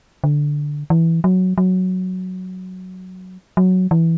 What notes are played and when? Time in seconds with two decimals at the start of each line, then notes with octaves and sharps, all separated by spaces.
0.24 D3
0.90 E3
1.24 F#3
1.58 F#3
3.57 F#3
3.91 E3